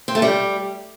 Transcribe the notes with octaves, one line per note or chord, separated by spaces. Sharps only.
C4
A3
G3